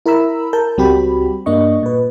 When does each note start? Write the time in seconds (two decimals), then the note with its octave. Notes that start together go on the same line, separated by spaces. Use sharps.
0.06 E4 A#4 A#5 B5 E6
0.53 A#4 A5 G6
0.77 C#2 G3 C4 F#4 G4 B5
1.46 G2 A#3 D4 D#5 C#6
1.83 A#2 B4